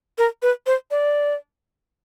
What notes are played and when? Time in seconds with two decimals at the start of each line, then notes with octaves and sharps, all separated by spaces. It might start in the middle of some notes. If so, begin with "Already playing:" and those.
0.18 A#4
0.42 B4
0.67 C5
0.91 D5